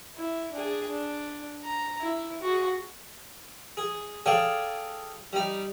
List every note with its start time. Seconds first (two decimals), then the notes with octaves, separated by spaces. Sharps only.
0.16 E4
0.53 D4 G#4
0.90 D4
1.64 A#5
2.01 E4
2.42 F#4 G#4
3.77 G#4
4.26 G#4 A4 D5 F5 G5 G#5
5.33 G3 D#4